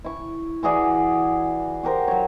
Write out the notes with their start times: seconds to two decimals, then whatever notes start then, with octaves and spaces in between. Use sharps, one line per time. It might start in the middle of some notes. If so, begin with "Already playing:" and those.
0.04 E4 C#6
0.63 E3 F#4 G#4 D5
1.83 F#4 G4 A#4 C5
2.08 F#3 C#5